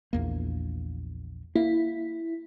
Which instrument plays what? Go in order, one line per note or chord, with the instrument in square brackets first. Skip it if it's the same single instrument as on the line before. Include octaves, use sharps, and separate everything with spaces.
[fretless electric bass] A#1 E2 A#3
[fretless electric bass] A#3 [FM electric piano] E4